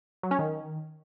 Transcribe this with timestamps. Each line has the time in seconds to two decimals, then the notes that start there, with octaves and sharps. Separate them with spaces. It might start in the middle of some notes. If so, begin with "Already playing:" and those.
0.23 F#3
0.31 C#4
0.39 D#3